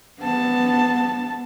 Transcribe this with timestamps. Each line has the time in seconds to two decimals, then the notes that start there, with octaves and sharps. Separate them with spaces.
0.21 B3 A5